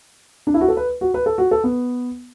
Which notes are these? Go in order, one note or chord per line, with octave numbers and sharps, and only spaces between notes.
D4
E4
F#4
A4
B4
F#4
B4
A4
F#4
A4
B3